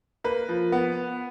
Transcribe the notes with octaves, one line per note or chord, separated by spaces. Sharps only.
A#3 B4
F3
B3